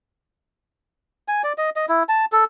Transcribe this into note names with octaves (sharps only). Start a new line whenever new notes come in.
G#5
D5
D#5
D#5
E4
A5
A4